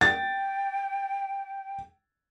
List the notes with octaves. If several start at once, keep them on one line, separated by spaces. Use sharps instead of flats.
G5 A6